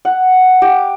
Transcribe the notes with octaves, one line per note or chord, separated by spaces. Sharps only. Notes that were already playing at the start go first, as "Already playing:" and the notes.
F#5
G4